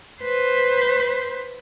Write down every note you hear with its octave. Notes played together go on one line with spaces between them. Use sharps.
B4 C5